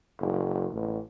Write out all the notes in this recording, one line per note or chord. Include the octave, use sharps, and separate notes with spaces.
F#1
A1